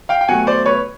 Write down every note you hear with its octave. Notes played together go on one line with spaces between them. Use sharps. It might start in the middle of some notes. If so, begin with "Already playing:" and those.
F5 G5
G5
B2 F#3 A3 F#5 G#5
C5 D5
B4 C#5